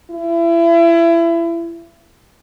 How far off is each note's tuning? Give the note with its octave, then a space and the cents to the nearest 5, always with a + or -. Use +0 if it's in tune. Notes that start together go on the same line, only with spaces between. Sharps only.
E4 +30